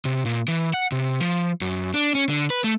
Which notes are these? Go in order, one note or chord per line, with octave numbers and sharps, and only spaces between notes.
C3
A#2
E3
F#5
C3
F3
F#2
D4
C#4
D3
B4
A3